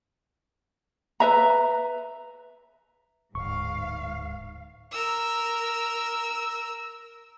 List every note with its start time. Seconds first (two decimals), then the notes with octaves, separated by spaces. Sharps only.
1.20 B4 E5 A#5
3.35 D1 G#2 F5 C#6
4.91 A#4 E6